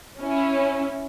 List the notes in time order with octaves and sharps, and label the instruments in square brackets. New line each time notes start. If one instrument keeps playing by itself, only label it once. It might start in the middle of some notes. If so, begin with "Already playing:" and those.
[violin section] C#4 E4